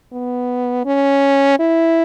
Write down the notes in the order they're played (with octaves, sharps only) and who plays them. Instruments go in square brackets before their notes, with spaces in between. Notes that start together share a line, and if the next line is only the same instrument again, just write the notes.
[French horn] B3
C#4
E4